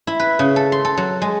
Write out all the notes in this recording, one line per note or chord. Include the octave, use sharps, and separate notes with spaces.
E4
B4
C#3
A4
C6
A4
F#3
G#3